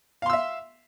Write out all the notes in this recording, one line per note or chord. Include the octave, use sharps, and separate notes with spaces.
E5 F5 C6 E6